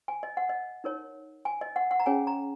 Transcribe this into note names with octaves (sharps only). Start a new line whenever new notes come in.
G#5
D#5
F#5
D#5
D#4 A#4 C#5
G#5
D#5
F#5
F#5
A#5
C#4 G#4 C#5 G#5
A#5